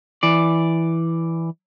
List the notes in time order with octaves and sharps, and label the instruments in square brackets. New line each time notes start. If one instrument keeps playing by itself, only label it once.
[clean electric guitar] E3 D5